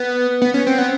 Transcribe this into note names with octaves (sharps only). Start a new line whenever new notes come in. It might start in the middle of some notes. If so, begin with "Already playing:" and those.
Already playing: B3
B3
C#4
C4
B3